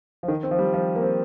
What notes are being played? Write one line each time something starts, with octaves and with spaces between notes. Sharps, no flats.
F3
D#3
C4
F3
G3
F3
A#3
C4